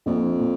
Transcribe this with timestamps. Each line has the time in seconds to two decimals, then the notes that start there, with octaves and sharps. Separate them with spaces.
0.06 A#1 F2 A#2
0.40 A#2